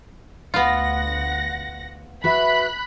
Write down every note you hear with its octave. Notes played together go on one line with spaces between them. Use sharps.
D2 B3 F4 F#5 A#6
F#4 B4 E5 B5 F#6